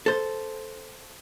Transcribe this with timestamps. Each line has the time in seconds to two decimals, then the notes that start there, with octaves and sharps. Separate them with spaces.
0.06 A4 C5